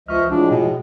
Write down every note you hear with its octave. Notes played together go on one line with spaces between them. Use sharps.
C#2 F3 F4 D#5 E5 C#6 F6
A2 F3 G#3 D4 F4 F#4
B2